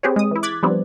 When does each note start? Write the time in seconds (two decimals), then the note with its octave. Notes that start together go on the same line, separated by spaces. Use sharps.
0.03 C4 G4 G#4 B4 C#5
0.16 G#3 D#6
0.31 E3 E4
0.43 D6 F#6 G#6 A6 B6
0.63 F3 G3 B3 C4 D4